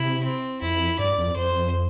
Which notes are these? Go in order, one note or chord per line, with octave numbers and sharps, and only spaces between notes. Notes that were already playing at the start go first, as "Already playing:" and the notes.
Already playing: C3 E4
C4
F2 E4
G2 D5
F2
F2 C5